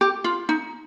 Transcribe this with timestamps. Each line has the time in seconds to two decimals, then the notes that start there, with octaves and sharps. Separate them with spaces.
0.01 G4
0.24 F4
0.49 D#4